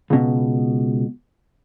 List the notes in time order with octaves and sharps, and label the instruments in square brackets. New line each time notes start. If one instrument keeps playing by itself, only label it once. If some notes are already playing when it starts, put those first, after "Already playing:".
[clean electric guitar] C#2 B2